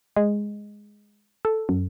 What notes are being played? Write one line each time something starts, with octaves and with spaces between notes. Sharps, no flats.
G#3
A4
F#2